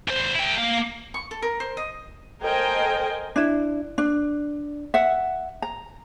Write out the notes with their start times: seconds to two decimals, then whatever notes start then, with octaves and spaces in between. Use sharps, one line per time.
0.08 E2 C5
0.35 E4 G5
0.57 A#3 F5
1.14 C#6
1.31 A4
1.42 A#4
1.60 C5
1.77 D#5
2.42 A4 A#4 C5 D#5 G5 G#5
3.36 D4 E4
3.98 D4
4.94 E5 F#5
5.62 A#5